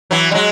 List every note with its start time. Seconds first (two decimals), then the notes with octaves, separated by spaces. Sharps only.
0.11 E3 F#3
0.31 G3
0.34 F#3 G#3